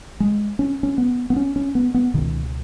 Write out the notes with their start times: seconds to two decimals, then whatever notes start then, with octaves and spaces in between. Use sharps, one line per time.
0.20 G#3
0.59 C#4
0.83 C#4
0.98 B3
1.30 B3
1.36 C#4
1.56 C#4
1.75 B3
1.94 B3
2.14 C#2 B2 D#3